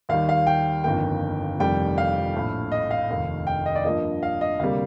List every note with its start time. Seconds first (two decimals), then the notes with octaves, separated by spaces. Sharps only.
0.09 D#2 D#3 G3 F5
0.29 F5
0.47 G5
0.84 G1 F2 D#3 A#3 G5
1.59 F1 F2 D#3 G3 G5
1.98 F5
2.35 A#1 A2 A3
2.72 D#5
2.91 F5
3.10 F1 D#2 D#3
3.47 G5
3.66 D#5
3.76 D5
3.85 G2 F3 A#3 D#5
4.23 F5
4.41 D#5
4.60 D2 C3 G3 A#3 F5